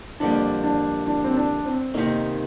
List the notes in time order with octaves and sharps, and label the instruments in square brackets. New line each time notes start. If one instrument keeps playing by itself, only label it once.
[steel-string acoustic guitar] F2 D3 G3 A#3 [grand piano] D4
[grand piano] D4
D4
C4
D4
C4
[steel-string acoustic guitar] C3 D#3 A#3 [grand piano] D#4